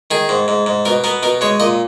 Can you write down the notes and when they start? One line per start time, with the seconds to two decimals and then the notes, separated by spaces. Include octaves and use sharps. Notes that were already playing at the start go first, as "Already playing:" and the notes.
0.11 D#3 G#4
0.29 G#2
0.48 G#2
0.66 G#2
0.85 B2 A#4
1.04 B3 A#4
1.23 B2 A#4
1.41 G#3 C#5
1.60 A#2 D#5